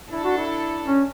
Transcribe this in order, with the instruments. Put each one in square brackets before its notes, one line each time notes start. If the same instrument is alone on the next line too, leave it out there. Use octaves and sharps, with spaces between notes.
[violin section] D4 A4 D5 [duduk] E4
[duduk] F#4
E4
C#4